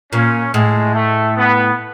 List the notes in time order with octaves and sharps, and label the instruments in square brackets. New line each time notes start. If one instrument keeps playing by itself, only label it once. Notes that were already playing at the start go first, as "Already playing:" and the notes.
[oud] A#2 [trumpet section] C#4
[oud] A2 [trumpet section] G#3
[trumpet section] A3
B3